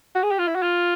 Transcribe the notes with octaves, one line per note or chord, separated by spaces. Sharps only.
F#4
G#4
G4
F4
E4
F#4
F4